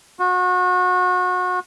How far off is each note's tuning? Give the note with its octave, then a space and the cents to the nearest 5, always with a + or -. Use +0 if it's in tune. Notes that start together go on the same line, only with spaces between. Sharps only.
F#4 -30